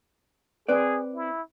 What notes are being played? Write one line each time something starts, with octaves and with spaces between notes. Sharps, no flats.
C4 G#4 B4 D5
E4